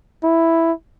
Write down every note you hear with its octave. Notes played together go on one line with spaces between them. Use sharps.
E4